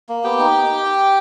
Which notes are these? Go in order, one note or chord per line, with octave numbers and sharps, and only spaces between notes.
A#3
B3 G4 G5
D#4